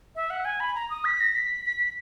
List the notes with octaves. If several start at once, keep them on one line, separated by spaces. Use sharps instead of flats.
E5
F#5
G#5
B5
A#5
D#6
B6
A#6
B6
B6
B6